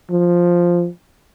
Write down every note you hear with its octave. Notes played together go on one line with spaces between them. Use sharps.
F3